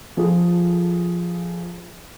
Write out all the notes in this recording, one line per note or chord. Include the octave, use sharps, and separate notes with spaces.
F3 F4 G#4 A4